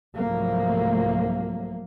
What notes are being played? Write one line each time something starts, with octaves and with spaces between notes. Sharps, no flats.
C2 G#2 F3 F#3 A3 A#3